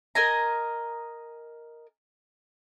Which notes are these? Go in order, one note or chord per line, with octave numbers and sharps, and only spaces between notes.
A#4 D#5 G#5 A#5